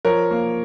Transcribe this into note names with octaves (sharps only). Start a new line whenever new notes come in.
F3 A#4 C#5
A#3